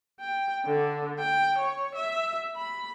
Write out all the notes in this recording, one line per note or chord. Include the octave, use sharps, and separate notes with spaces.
G5
D3
G5
C#5
E5
B5